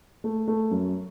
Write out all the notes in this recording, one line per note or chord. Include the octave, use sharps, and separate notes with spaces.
A3
A3
F#2